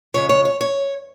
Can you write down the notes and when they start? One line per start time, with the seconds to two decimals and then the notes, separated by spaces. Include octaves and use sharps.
0.14 F2 C#3 G#3 C#5
0.29 C#5
0.45 C#5
0.61 C#5